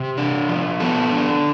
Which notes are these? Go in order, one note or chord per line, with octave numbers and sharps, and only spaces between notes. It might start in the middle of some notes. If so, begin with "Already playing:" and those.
Already playing: C3
D4
F3
B3 A4
D4